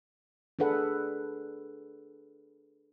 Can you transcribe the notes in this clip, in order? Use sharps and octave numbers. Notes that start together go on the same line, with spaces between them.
D4 G#4 A4 B4 F#5